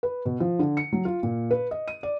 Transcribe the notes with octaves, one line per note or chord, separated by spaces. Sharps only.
B4
B2
F3
D3
C#7
F#3
F4
A#2
B4
D#5
D#7
D5